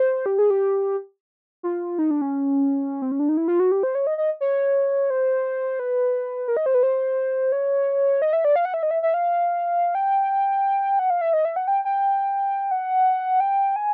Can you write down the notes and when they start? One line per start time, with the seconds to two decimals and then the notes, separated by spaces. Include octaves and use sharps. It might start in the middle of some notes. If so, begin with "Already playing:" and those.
Already playing: C5
0.26 G4
0.39 G#4
0.50 G4
1.63 F4
1.99 D#4
2.11 D4
2.21 C#4
3.02 C4
3.12 C#4
3.19 D4
3.29 D#4
3.37 E4
3.48 F4
3.60 F#4
3.72 G4
3.83 C5
3.95 C#5
4.07 D#5
4.18 D#5
4.41 C#5
5.10 C5
5.79 B4
6.48 A#4
6.57 D#5
6.66 C5
6.74 B4
6.83 C5
7.52 C#5
8.22 D#5
8.33 E5
8.45 D5
8.56 F5
8.65 F#5
8.74 E5
8.83 D#5
8.91 E5
9.03 E5
9.14 F5
9.95 G5
10.99 F#5
11.10 F5
11.21 E5
11.33 D#5
11.45 E5
11.56 F#5
11.68 G5
11.85 G5
12.71 F#5
13.40 G5
13.76 G#5